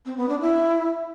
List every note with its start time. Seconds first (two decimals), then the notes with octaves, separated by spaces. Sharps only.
0.05 C4
0.17 B3
0.29 D4
0.40 E4